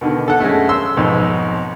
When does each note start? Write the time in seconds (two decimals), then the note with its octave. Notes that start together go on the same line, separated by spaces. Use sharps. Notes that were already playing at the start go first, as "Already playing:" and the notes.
0.01 B2 D3 D#3
0.28 A4 F#5
0.40 F#2 G#3 A3
0.69 C6 E6
0.97 B1 F2 G#2